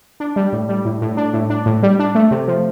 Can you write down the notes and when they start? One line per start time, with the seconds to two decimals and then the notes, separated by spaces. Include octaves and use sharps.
0.20 D4
0.36 G3
0.53 A2
0.69 G3
0.85 A2
1.02 A2
1.17 D4
1.33 A2
1.50 D4
1.66 A2
1.83 G3
1.99 D4
2.15 A3
2.31 C3
2.48 F3